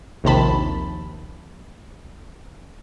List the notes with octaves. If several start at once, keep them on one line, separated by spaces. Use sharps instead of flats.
A#1 D#2 C3 A5 B5